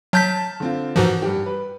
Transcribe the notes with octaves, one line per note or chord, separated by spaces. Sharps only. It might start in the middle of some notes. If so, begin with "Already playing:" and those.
F#3 A5 F6 G6 B6
D3 C4 F4
G#2 E3 F3 F#4 A#4
G2 G4
B4